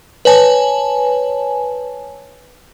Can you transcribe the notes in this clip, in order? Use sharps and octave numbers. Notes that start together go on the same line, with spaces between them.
B4 C#5 G#5 A5